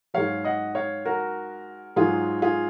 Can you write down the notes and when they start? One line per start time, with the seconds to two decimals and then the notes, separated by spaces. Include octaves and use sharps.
0.14 G#2 F#3 C#5 F5
0.44 D#5 F#5
0.75 C#5 F5
1.05 F#4 A#4
1.96 G#2 F#3 F4 G#4
2.42 F4 G#4